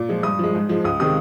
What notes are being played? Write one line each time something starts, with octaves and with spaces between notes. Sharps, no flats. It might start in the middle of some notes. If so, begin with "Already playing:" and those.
Already playing: A#2
F3 G#3
G2 D#6
F3 G#3
G#2
F3 G#3
C#2 D#6
C3 D#3 G#3 D#6